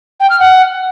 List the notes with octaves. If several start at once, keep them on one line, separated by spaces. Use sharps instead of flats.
G5
F6
F#5